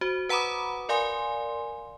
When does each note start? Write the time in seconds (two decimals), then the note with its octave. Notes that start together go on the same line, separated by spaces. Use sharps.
0.01 F#4 C5
0.29 B4 F#5 A#5 B5 D6 D#6
0.89 A#4 D5 F5 G#5 C6